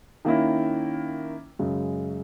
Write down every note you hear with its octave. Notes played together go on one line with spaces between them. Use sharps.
D#3 A#3 C#4 E4
F#2 C#3 G#3